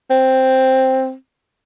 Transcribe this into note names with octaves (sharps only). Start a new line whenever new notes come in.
C4